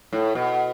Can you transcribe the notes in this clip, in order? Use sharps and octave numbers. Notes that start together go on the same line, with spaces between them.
A2
B2